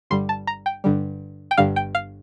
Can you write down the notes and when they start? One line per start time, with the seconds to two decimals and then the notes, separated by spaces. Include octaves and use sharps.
0.10 G1 G2 D3 G3 C6
0.29 A5
0.47 A#5
0.66 G5
0.84 G1 G2 D3 G3
1.51 G5
1.58 G1 G2 D3 G3 F5
1.76 G5
1.95 F5